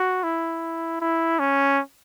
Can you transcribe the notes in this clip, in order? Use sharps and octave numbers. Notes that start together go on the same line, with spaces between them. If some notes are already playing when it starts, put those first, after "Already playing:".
Already playing: F#4
E4
E4
C#4